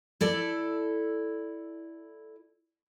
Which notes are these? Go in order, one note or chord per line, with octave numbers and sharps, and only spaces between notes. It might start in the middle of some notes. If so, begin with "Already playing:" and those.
E4 A4 D5